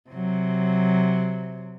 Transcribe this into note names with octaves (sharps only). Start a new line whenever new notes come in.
C3 F#3